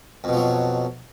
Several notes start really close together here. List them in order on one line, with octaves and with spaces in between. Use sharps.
F2 B2 F3 F#3